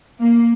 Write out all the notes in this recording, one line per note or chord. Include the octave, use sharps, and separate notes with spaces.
A#3